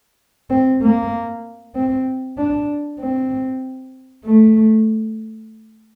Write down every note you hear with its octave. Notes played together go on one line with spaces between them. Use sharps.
C4
A#3
C4
D4
C4
A3